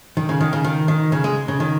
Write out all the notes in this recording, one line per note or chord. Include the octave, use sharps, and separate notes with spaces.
D#3
C#3
D#3
C#3
D#3
D#3
C#3
G#3
C#3
D#3